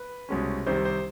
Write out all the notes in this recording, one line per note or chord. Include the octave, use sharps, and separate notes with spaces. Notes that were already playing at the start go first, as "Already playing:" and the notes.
Already playing: B4
C2 B2 G#3 C#4
C2 C3 D#3 G3 C4 C5
C5